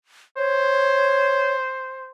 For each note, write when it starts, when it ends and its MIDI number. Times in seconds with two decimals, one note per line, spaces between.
0.37 2.11 72
0.37 1.54 73